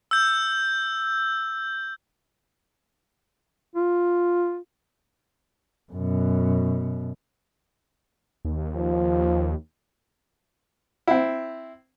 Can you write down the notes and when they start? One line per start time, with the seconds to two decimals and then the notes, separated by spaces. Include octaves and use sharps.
0.11 E6 G6
3.76 F4
5.92 F#2 B2
8.45 D#2
8.76 F3
11.07 C4 E4